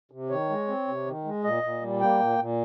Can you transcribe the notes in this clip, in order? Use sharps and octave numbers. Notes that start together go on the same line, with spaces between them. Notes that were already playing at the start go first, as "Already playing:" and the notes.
C3
D#3 C#5
G#3
C4
C3
D#3
G#3
A#2 D#5
A#2
G3
A#3 G5
A#2
A#2